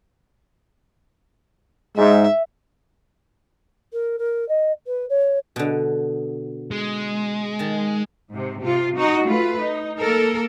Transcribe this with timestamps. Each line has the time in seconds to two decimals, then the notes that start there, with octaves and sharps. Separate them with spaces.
1.97 G#2 E5
3.93 A#4
4.18 A#4
4.48 D#5
4.86 B4
5.09 C#5
5.56 B2 D3
6.71 G#3
7.59 D#3 A5
8.31 G#2 C3
8.61 C3 F4
8.96 D#4 F#4
9.26 A3 F4 B4
9.62 D#4
9.98 A#3 A4 A#4